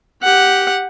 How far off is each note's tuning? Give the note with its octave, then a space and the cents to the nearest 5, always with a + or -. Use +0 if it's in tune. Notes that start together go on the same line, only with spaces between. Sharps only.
G4 +0 F#5 +0